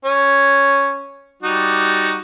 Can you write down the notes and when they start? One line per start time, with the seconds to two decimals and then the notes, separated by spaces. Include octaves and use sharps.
0.05 C#4
1.43 G3 D#4 F#4